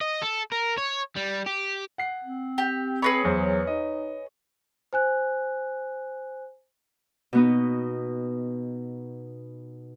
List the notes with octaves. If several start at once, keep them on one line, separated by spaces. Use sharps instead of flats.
D#5
A4
A#4
C#5
G3
G4
F#5 C7
C4
G4
G#4 B4 C#5 B5 A#6
E2 F#3 C5
D#4 D#5
C5 G#5 F#6
B2 B3 D#4